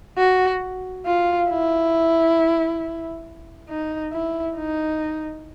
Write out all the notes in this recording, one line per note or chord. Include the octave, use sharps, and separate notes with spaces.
F#4
F4
E4
D#4
E4
D#4